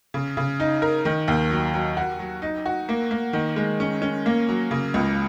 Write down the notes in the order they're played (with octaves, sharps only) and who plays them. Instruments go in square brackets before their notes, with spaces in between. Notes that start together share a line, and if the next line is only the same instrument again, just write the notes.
[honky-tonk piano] C#3
C#3
D#4
A#4
D#3
D#2
F#3
F#3
F#4
F#3
D#4
F#4
A#3
A#3
D#3
G#3
C#4
C#4
A#3
F#3
C#3
C#2